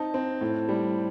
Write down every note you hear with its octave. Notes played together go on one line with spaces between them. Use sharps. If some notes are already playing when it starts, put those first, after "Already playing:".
Already playing: C4 D#4 A5
C4
A2
G3